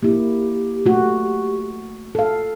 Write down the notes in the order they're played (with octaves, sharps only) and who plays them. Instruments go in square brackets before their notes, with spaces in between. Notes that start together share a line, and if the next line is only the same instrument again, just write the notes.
[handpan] A#3 E4 [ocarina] G4
[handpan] A3 F#4
A4 F5